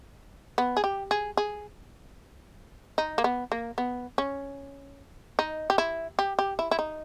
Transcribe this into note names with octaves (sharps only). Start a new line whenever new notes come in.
B3
G#4
G4
G#4
G#4
D#4
A#3
B3
A#3
B3
C#4
D#4
G4
E4
G4
G4
E4
E4
D#4